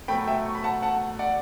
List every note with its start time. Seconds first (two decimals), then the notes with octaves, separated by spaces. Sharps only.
0.08 B2 F#3 A3 G5 B5
0.27 E5 G5
0.46 C#6
0.55 B5
0.64 F#5 A5
0.82 F#5 A5
1.19 D5 F#5